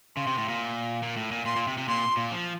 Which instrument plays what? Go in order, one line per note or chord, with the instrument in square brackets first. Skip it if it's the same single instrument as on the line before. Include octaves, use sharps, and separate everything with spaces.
[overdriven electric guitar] C#3 [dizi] C6
[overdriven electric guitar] C3
A2
A#2
A#2
A2
A#2
[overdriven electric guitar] A#2 [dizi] C6
[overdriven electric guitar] A#2
C3
C3
[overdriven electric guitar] A#2 [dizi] C6
[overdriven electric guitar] A#2
F3